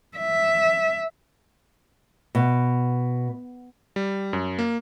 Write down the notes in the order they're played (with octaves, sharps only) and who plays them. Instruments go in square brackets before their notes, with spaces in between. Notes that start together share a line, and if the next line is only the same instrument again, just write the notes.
[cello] E5
[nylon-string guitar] B2
[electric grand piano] G3
F#2
A#3